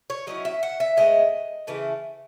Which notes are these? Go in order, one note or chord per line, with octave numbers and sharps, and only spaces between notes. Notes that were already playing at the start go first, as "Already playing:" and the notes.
C#5
F#3 C#4 E4 D#5
E5
F#5
E5
A2 G#3 B3 D#5
C#3 E3 A3 B4